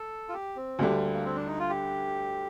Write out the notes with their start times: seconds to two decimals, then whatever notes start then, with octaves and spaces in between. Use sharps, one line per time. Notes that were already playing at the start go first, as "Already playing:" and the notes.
Already playing: A4
0.29 F4
0.33 G4
0.56 C4
0.79 D2 D3 G3 A#3
0.90 A#3
1.02 A#3
1.13 A#3
1.25 C4
1.36 D4
1.47 D#4
1.59 F4
1.69 G4